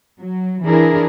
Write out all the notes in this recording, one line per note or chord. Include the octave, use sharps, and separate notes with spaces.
F#3
E3 D4 E4 G#4 A#4